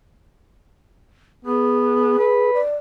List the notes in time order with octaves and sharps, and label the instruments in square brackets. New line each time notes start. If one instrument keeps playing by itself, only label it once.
[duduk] B3 [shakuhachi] G#4
[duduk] B4
[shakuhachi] D5